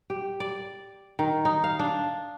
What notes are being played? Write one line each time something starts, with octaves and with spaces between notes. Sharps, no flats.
G4
D5
D#3
D#4
F5
D4